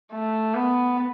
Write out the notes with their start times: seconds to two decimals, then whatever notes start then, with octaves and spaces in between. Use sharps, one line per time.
0.12 A3
0.54 B3